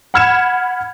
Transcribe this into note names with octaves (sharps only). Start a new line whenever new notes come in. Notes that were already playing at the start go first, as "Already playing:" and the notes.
F#5 B5 F6 G#6 C#7 E7